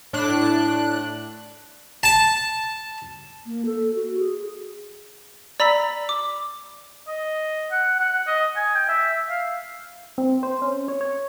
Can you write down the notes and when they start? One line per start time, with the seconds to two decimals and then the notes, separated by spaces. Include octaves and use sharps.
0.13 A2 D4 F#6
2.03 A5
3.46 A#3
3.66 A4
3.94 F#4
4.19 G#4
5.60 D5 A#5 B5 E6 B6
6.09 D6
7.07 D#5
7.71 F#5
8.00 F#5
8.27 D#5
8.56 G#5
8.75 G5
8.89 E5
9.30 F5
10.18 C4
10.43 C5
10.62 C#4
10.88 C#5
11.01 C#5